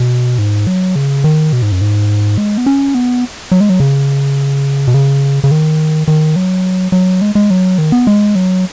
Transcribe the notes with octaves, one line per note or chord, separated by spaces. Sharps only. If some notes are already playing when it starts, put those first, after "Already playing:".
Already playing: B2
G#2
F#3
C#3
D#3
B2
G#2
F#2
G#2
G#3
B3
C#4
B3
F#3
G#3
F#3
C#3
B2
C#3
C#3
D#3
D#3
F#3
F#3
G#3
G#3
F#3
D#3
B3
G#3
F#3